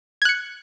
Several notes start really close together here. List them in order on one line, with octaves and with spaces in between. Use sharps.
G#6 F#6 C#7